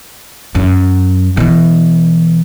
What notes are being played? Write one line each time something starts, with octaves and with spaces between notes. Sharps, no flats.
F#2
B2 E3